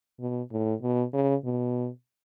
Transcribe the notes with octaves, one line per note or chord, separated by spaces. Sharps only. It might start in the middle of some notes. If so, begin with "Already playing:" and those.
B2
A2
B2
C#3
B2